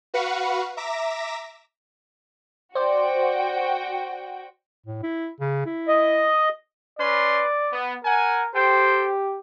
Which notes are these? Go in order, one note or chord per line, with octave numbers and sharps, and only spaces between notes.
F#4 B4 F5 F#5 B5 C#6
E5 A#5 D6 A#6 B6 E7
F#4 C5 D5 G5
A2
E4
C#3
E4
D#5
C#4 B4 D5 C6
B3
A#4 F#5 G#5
G4 A4 C5 G5